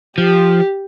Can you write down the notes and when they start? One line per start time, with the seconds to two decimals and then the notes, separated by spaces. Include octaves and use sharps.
0.18 F3 G4